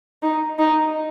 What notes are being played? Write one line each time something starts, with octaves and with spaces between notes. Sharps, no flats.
D#4
D#4